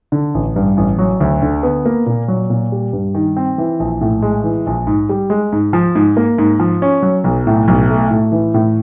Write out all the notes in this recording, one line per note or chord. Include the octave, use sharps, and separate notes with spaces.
D3
A1
G2
A1
F#3
D2
D3
B3
A#3
A#2
F#3
A#2
G3
G2
D#3
C4
E3
A#1
A2
G#3
E3
A#1
G#2
G3
G#3
G#2
F3
G#2
A#3
G#2
F3
C#4
F#3
B1
A2
B1
A3
A2
E3
A2